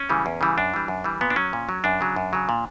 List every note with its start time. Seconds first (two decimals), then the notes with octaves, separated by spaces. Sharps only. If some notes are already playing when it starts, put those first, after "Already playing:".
Already playing: C#4
0.09 C#3 E3 G3
0.26 E2
0.41 C#3 E3 G3
0.58 F#2 D4
0.74 E3 G3
0.88 F#2
1.04 E3 G3
1.21 A#2 B3
1.30 D4
1.36 F#3 C#4
1.53 A#2
1.69 F#3
1.84 F#2 D4
2.01 C#3 F#3
2.16 F#2
2.33 C#3 F#3
2.49 A#2